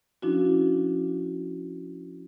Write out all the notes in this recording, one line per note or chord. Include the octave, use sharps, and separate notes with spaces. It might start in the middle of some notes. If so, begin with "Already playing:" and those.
F3 C#4 D4 E4 F#4